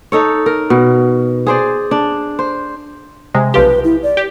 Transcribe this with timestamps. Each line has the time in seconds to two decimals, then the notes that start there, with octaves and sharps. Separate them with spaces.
0.12 D#4 A4 C#5
0.46 A#4
0.70 B2
1.47 G#4 C5 D5
1.91 D4
2.39 C5
3.34 C3 G#3
3.54 B1 F3 G4 B4
3.84 E4
4.03 D5
4.17 G4